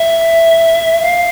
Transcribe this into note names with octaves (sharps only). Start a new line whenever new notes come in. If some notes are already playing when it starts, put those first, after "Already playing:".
Already playing: E5
F5